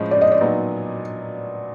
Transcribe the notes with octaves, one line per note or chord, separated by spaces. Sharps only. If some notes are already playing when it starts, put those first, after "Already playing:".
Already playing: A2 F3 G#3 C#4 D#5
D5
D#5
D5
A#2 F#3 B3 D#4